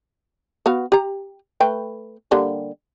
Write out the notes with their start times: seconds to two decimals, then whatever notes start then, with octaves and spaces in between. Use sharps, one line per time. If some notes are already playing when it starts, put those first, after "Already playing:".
0.66 B3 F#4 F5
0.92 G4 A#5
1.60 A3 B4 G5
2.31 D3 G3 A#3